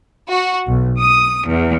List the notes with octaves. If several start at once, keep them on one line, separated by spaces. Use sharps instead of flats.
F#4
B1
D#6
E2